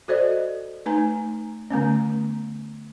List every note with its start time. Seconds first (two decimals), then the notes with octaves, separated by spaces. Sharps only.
0.08 F#4 A4 C5 D5 D#5
0.86 A3 D#4 B4 G#5 A#5
1.70 D3 A3 B3 C#4